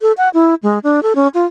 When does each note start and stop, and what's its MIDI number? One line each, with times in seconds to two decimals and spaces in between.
0.02 0.12 69
0.18 0.29 78
0.34 0.55 64
0.63 0.79 56
0.83 1.03 62
1.03 1.13 69
1.15 1.28 61
1.34 1.46 65